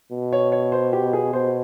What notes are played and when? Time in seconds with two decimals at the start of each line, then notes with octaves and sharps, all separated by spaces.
0.12 B2
0.32 C#5
0.52 C#5
0.72 C5
0.93 G4
1.13 G#4
1.33 B2 C5